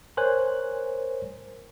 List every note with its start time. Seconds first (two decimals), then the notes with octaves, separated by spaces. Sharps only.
0.17 A#4 C5 C#5 G#5 F#6